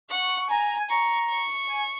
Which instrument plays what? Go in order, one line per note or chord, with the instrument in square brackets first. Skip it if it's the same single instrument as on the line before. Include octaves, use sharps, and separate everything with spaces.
[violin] F#5 [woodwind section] C#6
[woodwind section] C#6
[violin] G#5 [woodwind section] A#5
[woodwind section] G#5
[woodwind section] A#5 [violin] C#6
[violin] C#6
[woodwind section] G#5